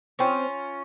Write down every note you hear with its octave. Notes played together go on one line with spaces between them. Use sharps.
C4 C#4 F4